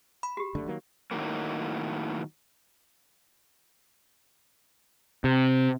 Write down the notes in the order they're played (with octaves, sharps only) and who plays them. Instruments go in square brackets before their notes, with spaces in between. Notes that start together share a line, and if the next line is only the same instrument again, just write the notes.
[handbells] B5
[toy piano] F#4 G4
[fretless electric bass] F#1 D3 A3
D#3 F#3 A#3
[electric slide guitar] A2 D#3 F#3 G3 A#3
[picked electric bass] C3